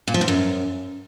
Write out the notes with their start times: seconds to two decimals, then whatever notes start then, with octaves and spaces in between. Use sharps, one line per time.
0.08 A#2
0.14 F3
0.21 G#2
0.28 F#2